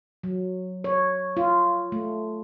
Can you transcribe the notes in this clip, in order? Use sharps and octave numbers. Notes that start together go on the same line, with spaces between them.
F#3
C#5
F4
A3